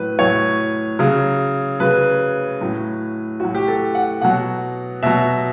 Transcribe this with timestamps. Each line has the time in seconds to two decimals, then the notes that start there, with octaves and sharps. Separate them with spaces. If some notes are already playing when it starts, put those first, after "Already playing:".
Already playing: A2 F#3 B4
0.19 A2 F#3 C#5
0.99 C#3 F#3
1.80 C#3 F#3 B4
2.61 A2 F#3
3.40 A2 F#3 F#4
3.55 G4
3.68 A4
3.95 F#5
4.21 B2 F#3 F#5
5.03 B2 F#3 E5